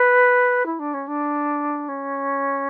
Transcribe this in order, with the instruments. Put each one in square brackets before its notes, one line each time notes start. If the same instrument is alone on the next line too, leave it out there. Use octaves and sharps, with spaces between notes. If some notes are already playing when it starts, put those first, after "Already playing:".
Already playing: [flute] B4
E4
D4
C#4
D4
C#4